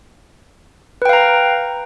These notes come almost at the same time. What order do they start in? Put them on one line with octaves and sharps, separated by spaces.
B4 G5 F5 A#5